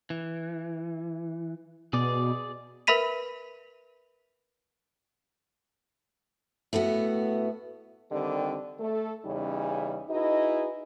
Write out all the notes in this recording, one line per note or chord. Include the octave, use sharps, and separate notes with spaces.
E3
B2 G#4 D5
A#4 B4 E5 B5 B6 D#7
A2 A3 B3 F#4
D3 D#3 G3 C4 G4 D5
A3 A4
E2 C#3 G3 C#4 D#4
D#4 E4 F#4 G#4 B4 D#5